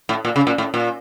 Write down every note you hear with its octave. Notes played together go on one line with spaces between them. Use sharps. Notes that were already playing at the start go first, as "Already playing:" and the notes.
A2
A#2
C#3
A#2
A2
A#2